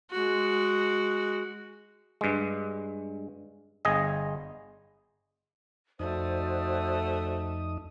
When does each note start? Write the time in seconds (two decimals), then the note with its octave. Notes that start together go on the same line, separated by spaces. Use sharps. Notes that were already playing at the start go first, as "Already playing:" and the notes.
0.11 G#3 F#4
2.21 G2 G#3
3.85 G1 G#4 D#5
5.99 F2 A3 D#4 F#4 C5 D5 D#6